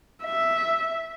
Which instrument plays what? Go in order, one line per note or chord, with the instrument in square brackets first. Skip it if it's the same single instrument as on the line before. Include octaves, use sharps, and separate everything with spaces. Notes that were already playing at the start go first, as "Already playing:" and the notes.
[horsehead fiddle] E5